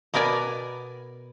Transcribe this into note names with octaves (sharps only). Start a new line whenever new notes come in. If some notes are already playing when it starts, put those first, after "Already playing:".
B2 B3 A#4 D5 G#5